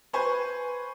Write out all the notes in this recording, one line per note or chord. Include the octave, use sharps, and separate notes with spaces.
B4 C5 G#5 C#6